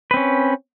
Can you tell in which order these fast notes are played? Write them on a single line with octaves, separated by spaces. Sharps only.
B4 C4 C#4